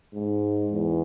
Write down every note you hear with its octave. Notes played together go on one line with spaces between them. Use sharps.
G#2
E2